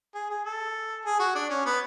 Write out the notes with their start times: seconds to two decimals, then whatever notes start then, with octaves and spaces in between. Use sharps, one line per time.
0.15 G#4
0.30 G#4
0.45 A4
1.05 G#4
1.19 F#4
1.35 D4
1.50 C#4
1.66 B3